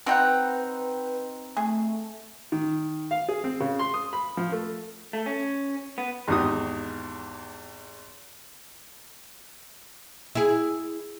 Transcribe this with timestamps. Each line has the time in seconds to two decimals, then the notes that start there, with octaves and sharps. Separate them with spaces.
0.06 C4 D#4 F#4 B4 F#5 G5
1.57 A3 G#4
2.52 D#3
3.11 F5
3.29 G#4
3.44 C4
3.60 C#3
3.79 C6
3.94 D#6
4.13 B5
4.37 F3
4.52 A3
5.13 A3
5.26 C#4
5.98 B3
6.28 G#1 E2 D#4 G4 D#6
10.35 E4 G#4